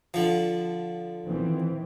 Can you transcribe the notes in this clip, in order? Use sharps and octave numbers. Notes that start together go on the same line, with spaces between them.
D3 F3
D#3 E3 C4